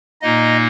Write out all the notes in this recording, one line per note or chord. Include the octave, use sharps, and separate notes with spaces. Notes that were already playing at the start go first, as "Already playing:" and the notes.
A#2 A#3 D#4 D#5